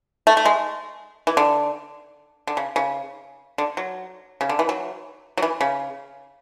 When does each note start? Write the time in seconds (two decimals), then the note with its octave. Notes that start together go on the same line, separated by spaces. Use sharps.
0.27 A3
0.37 A3
0.45 G#3
1.27 E3
1.37 D3
2.47 D3
2.57 C#3
2.76 C#3
3.58 D3
3.77 F#3
4.41 C#3
4.49 D3
4.59 E3
4.69 F#3
5.38 F#3
5.42 E3
5.61 C#3